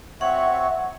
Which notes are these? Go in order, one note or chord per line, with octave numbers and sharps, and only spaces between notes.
C4 F#4 C#5 E5 F#5